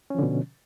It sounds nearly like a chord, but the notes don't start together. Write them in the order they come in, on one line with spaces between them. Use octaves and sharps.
C#4 F3 D3 B2